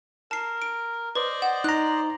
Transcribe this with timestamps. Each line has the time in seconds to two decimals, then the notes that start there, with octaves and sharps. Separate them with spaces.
0.31 A#4 A5 C7
0.62 D7
1.15 B4 C5 D5 D#5
1.42 F#5
1.64 D#4 A#5 F#6